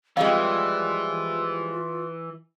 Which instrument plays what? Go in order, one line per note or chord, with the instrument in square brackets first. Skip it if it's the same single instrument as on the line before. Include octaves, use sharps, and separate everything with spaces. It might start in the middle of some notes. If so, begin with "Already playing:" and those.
[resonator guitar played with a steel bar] F2 G3 G#3 [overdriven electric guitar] E3 [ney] F4 [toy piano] D#5 F5